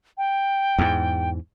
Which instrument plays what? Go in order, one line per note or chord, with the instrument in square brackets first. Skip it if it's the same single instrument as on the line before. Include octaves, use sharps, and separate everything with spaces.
[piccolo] G5
[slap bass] E2 G#2